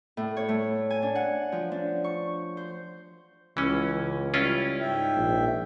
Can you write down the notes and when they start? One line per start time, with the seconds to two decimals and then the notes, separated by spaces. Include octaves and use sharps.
0.17 A2
0.37 C#5
0.49 A3
0.90 G#5
1.02 D4
1.15 F#5
1.52 F3
1.72 D4
2.04 C#6
2.57 C5
3.57 C#2 E3 C#4
4.34 G3 C#4 E4 F4
4.80 G#2 E5 G5
5.16 A#1